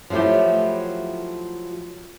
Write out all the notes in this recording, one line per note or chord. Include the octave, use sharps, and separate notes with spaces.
F3 F#3 A3 E4 G4